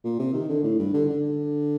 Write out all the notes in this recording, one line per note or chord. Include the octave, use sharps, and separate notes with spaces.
A#2
C3
D#3
D3
A2
G2
D3
D3